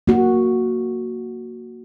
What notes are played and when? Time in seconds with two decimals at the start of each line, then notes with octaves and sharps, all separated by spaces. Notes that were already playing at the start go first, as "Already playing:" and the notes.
0.07 A#3 F#4